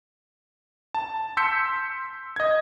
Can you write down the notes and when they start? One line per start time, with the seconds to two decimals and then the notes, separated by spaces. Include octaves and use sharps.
0.94 A5
1.37 C6 E6 G6 B6 C#7
2.36 D#5 G#6